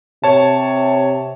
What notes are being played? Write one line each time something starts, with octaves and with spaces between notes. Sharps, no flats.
C3 C#5 A5